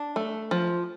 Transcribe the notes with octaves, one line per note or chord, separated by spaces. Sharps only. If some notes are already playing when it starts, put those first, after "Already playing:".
Already playing: D4
A3
F3